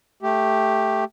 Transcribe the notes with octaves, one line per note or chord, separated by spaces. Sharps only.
A3 G4